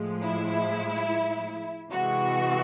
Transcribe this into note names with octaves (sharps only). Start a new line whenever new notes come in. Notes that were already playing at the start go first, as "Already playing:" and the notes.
Already playing: A2 F3 G#3
E4
C3 E3 G#3 F#4